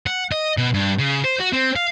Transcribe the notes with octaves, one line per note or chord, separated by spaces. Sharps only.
F#5
D#5
B2
G2
C#3
C5
F#4
C4
F5